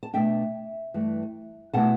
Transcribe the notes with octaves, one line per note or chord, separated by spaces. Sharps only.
A5
B2 A3 D4 E5 G5
G2 E3 A3
B2 A3 E4 F#5 A5